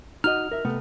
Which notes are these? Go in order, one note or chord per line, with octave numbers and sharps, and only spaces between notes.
D#4 F#4 D#5 F6
A#4 E5
C3 A3 B3